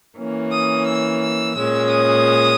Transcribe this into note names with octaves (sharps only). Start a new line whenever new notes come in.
E3 A#3 C#4
D#6
E6
E6
A#2 G#3 C#4 E6
D#6